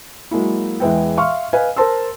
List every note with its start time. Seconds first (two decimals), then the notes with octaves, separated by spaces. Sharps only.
0.31 F#3 G#3 A#3 E4
0.80 E2 E3 G#3 B4 E5 G5
1.17 E5 F5 C6 C#6 F6
1.53 B4 D#5 F5 G#5
1.76 A#4 C5 A5 C6 E6